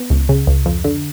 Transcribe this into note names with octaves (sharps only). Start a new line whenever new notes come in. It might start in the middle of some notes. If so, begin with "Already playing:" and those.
Already playing: B3
C#2
C#3
C#2
F2
D3